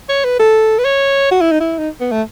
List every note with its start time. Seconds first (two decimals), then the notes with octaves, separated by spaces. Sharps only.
0.09 C#5
0.25 B4
0.39 A4
0.79 B4
0.85 C#5
1.31 F#4
1.41 E4
1.52 D#4
1.60 E4
1.78 D#4
2.00 B3
2.12 A3